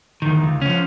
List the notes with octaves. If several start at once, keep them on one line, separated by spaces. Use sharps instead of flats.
E2 D#3
C#2
F3 C#4